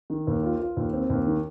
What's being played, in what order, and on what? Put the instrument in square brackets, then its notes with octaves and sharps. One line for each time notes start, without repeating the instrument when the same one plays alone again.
[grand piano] D#3
D#2
F4
F4
D#2
C4
D#2
D#3